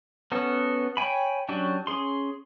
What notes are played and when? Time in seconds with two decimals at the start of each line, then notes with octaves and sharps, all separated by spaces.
0.32 B3 C#4 F#4 A4
0.97 C#5 G5 G#5 B5
1.49 F#3 C#4 D4 F#4 G4
1.87 C#4 G#4 C6